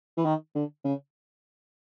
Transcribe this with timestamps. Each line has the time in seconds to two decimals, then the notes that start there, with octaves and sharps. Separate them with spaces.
0.17 E3
0.25 D#3
0.55 D3
0.85 C#3